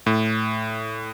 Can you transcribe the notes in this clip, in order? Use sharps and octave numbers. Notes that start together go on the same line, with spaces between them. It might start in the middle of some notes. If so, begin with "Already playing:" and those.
A2